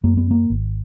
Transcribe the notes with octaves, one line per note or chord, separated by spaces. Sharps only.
F#2 A#3
B3
A#3
G#1